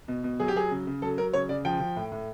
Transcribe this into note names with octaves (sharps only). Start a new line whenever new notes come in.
B2
B2
F#3 G#4
G4
F#3 G#4
C#3
C#3
F#3 A4
F#3 A#4
C#3 C#5
C#3 D5
F3 G5
F3
A2
A2